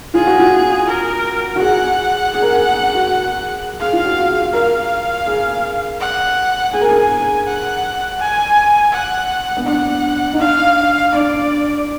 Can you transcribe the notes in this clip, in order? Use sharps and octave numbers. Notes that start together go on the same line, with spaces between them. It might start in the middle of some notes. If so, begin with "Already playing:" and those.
F4 G#4
F#4
F4
A#4
F#4
G#4 F#5
G#4
A#4
G#4
F#4
G#4
G#4 F5
F4
F#4
G#4
A#4 F5
G#4
F#5
G#4 G#5
A#4
G#4
F#5
G#5
F#5
B3
D4 F#5
D#4
D4 F5
D4 D5